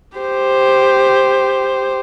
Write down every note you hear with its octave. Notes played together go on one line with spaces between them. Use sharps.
G4 C5